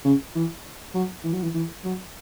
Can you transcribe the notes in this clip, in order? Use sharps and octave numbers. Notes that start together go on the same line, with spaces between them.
C#3
E3
F#3
E3
F#3
E3
E3
F#3